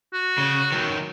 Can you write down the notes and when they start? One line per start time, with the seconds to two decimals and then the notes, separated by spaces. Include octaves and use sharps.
0.13 F#4
0.38 C#3
0.72 D#3 F#3